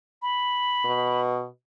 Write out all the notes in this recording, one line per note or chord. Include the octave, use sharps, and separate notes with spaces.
B5
B2